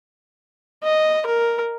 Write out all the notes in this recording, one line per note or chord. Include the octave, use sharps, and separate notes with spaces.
D#5
A#4